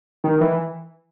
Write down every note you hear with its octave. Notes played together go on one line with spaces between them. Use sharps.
D#3
E3